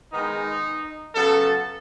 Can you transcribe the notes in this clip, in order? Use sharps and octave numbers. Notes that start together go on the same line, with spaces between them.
D#3 G#3 B3 D#4
C#3 F#3 B3 A4